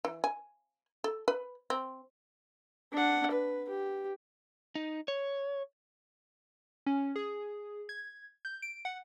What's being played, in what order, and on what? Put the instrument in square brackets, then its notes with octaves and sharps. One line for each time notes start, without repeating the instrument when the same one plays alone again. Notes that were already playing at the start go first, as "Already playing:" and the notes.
[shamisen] E3
G#5
A4
B4
C4
[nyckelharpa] D4 F#5
B4
G4
[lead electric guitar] D#4
C#5
[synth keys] C#4
G#4
G#6
G6
D7
F#5